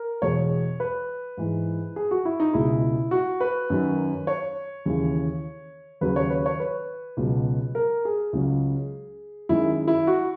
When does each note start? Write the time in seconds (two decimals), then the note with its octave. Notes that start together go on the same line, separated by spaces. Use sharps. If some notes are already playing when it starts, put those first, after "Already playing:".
Already playing: A#4
0.22 E2 B2 G#3 C#5
0.80 B4
1.37 G#2 E3 G#3
1.96 G#4
2.11 F#4
2.25 E4
2.40 D#4
2.53 C#2 B2 G#3 E4
3.11 F#4
3.40 B4
3.70 F#2 D#3 F#3
4.27 C#5
4.86 D#2 C#3 E3
6.01 D#2 C#3 F#3 B4
6.16 C#5
6.30 B4
6.46 C#5
6.60 B4
7.17 C#2 B2 F#3
7.75 A#4
8.05 G#4
8.33 C#2 C#3 F#3
9.49 F#2 D#3 G#3 E4
9.88 E4
10.07 F#4